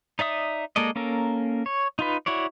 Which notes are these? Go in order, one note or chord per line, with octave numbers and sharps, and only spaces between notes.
D#4 D5 E5 D#6
G#3 A#3 A4 D5 D#5
A#3 C#4 A4 A#4
C#5
D#4 F4 B4
E4 F#4 C#5 D5